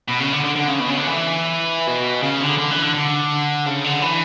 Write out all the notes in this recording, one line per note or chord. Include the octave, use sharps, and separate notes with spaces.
B2
C#3
D3
D3
D3
C#3
B2
C#3
D3
E3
B2
C#3
D3
D3
E3
D3
D3
C#3
D3
E3